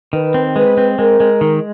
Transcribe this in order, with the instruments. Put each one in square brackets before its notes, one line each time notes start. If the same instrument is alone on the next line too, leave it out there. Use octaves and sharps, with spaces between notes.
[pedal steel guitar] D#3 [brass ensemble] B4
[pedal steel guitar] C4
[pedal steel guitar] G#3 [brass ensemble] B4
[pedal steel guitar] C4
[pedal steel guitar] G#3 [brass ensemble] A#4
[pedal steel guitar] G#3
D#3